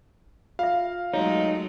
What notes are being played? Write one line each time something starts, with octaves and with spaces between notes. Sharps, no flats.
F4 E5 F5
F#3 G#3 A3 D#4 C#5